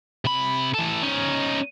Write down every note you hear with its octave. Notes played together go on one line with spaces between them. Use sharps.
C3 B5
E3 A4
C#4 D#4